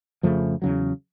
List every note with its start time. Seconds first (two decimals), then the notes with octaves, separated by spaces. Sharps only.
0.23 F2 C#3 F3 A3
0.62 E2 C#3 F#3